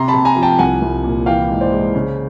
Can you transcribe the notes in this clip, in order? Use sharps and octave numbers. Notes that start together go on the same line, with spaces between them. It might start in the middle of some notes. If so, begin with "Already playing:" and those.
Already playing: C3 A#5 C6
A5 B5
C3
G#5 A#5
F3
G5 A5
C2 F#5 G#5
C2
A#2
E3 F5 G5
G#2
C5 D5
G#3
C#3